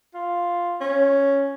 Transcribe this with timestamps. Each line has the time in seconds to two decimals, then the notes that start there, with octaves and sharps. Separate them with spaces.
0.14 F4
0.81 C#4